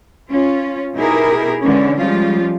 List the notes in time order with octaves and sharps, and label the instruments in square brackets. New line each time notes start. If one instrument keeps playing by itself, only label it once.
[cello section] C#4 F4
B2 D#4 E4 G4 G#4 A#4
D3 E3 G#3 C#4
F3 G3 G#3 C#4 F4